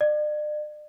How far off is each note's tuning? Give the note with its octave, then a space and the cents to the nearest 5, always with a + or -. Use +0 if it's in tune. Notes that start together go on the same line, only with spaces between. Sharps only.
D5 +40